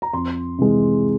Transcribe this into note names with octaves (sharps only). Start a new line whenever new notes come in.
A#5
F2 C6
C3 E3 G#3